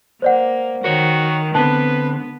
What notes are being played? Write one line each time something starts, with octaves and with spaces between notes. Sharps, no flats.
A#3 C5 D5 F#5
D#3 F#4 A#4 C#5
D3 B3 C4 B4 A5